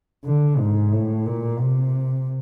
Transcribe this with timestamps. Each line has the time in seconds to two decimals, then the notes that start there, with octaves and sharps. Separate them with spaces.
0.25 D3
0.58 G#2
0.92 A2
1.26 A#2
1.59 C3